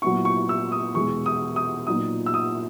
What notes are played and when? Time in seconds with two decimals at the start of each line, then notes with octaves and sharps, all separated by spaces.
0.02 A#2 F#3 B3 E4 C#6
0.25 C#6
0.49 E6
0.72 D#6
0.95 E2 B2 G#3 C#6
1.26 D#6
1.56 D#6
1.87 A#2 F#3 B3 D#4 D#6
2.26 E6
2.34 D#6